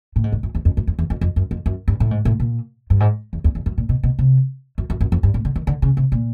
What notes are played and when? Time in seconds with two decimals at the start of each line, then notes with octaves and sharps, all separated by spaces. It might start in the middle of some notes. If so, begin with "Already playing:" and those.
0.16 A2
0.24 G#2
0.32 G2
0.43 F#2
0.55 E2
0.65 F2
0.77 F#2
0.87 F2
0.99 E2
1.10 F2
1.21 F2
1.36 F#2
1.51 F2
1.66 F#2
1.88 G2
2.00 A2
2.11 G#2
2.25 A2
2.40 A#2
2.90 G2
3.00 G#2
3.33 E2
3.44 E2
3.55 E2
3.66 F#2
3.78 A#2
3.89 B2
4.03 B2
4.19 C3
4.78 F#2
4.90 F#2
5.01 F#2
5.12 F2
5.23 G2
5.34 A2
5.45 D3
5.56 D#3
5.67 D3
5.82 C#3
5.97 C3
6.12 A#2